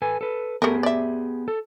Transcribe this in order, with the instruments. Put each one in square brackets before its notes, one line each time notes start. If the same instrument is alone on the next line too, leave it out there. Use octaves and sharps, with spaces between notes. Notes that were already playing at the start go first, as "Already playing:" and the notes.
[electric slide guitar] A4 B4 G#5
A4 B4
[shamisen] A3 A#4 [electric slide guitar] B3 G4 G#4
[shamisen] D5 E5
[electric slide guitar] A4